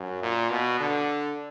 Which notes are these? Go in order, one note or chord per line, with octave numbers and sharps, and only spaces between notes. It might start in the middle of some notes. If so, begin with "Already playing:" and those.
Already playing: F#2
A#2
B2
D3